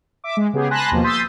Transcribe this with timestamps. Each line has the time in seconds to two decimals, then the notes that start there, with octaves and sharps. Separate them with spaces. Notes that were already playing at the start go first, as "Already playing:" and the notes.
0.24 E5 D6
0.37 G#3
0.53 C#3 B3 G4 G#4
0.71 G#5 A5 B5 C6 F#6 A#6
0.91 D#2 B2 F3 A#3
1.04 C6 D#6 E6 G6 A6 B6